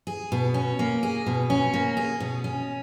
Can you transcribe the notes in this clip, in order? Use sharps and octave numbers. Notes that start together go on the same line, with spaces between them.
G#4
B2
C#4
A#3
G#4
B2
C#4
A#3
G#4
B2
C#4